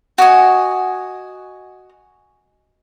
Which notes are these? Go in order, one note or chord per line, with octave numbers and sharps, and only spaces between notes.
F#4 D#5 G#5